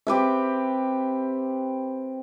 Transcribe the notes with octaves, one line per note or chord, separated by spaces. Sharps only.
C4 G4 B4 E5